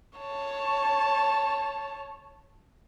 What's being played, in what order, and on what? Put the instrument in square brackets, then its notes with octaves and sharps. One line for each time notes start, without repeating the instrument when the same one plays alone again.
[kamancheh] C#5 A5